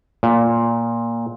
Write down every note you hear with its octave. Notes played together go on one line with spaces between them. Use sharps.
A#2